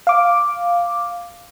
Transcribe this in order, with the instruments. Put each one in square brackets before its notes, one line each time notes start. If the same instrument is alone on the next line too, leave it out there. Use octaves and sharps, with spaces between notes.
[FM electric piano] F5 D6